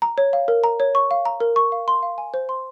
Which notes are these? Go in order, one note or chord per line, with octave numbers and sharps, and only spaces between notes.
A#5
C#5
F5
A#4
A#5
C#5
C#6
F5
A#5
A#4
C#6
F5
C6
F5
G#5
C5
C6